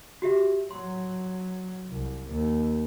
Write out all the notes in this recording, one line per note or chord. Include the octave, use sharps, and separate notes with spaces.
F#4 G4 E5
F#3 C6
C2
D#2